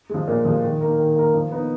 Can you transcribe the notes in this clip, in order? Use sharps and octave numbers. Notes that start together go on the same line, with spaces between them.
F3 G#3
A#2
F3 G#3
D#3
A#3 D#4 A#4
D#3
A#3 D#4 A#4
F3
B3 D#4